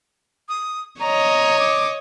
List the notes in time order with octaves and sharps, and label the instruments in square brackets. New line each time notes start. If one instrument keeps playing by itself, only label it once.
[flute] D#6
[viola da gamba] C#5 D#5 [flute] A#5
[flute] D6